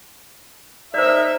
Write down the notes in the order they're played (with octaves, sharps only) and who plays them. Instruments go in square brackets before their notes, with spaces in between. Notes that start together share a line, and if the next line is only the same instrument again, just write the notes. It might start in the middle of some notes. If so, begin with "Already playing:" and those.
[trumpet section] D#4 A#4 E5 [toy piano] C5 D5